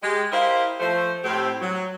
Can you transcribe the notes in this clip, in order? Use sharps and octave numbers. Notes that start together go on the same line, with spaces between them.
G#3 G4
E4 G4 A#4 C5 D#5 F5
F3 A3 C5
A2 C4 G4
F#3